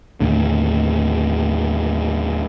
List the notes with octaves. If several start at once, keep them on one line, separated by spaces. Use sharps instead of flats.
D#2 A2 D3